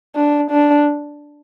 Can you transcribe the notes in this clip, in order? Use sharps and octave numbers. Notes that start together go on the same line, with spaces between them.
D4
D4